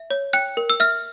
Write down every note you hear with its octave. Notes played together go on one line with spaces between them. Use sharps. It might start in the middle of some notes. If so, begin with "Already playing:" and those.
Already playing: E5
C#5
G5 F#6
A#4
E6
E5 F6